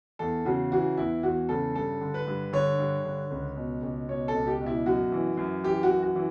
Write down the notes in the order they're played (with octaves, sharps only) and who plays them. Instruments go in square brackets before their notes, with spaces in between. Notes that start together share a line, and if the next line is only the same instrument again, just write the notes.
[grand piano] E2 A4
C#3 F#4
E3 F#4
E2 E4
E2 F#4
C#3 A4
G2 A4
D3
B4
G2
D3 C#5
G2
D3
C#2
B2
C#2
B2 C#5
A4
C#2
G4
B2
E4
F#2 F#4
E3
F#2
E3 G4
F#4
F#2
F#4
E3